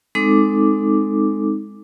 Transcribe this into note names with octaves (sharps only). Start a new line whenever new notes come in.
G#3 C4 D#4 A4 D6